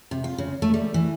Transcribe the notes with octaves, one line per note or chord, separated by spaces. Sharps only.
C3
F4
C#3
A3
G3
E3